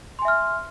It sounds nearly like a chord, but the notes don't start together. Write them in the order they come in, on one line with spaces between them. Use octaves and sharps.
C6 G#5 E5 F6